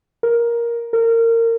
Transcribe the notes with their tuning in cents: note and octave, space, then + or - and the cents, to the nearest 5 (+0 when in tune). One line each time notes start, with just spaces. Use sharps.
A#4 +10
A#4 -25